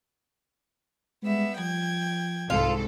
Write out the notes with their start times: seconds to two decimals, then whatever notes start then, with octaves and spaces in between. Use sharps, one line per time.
1.23 G3 G#3 B3 E5
1.59 F3 G5 G#6
2.50 C2 G#2 F4 A4